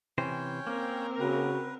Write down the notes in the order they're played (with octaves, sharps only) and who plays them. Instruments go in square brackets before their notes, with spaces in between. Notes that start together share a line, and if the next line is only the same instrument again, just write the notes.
[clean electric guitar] C3 E3 C5 [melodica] C#4 C#5 G5
[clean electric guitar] A#3 [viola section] C4 A#4
[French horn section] C#3 F#4 [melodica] B4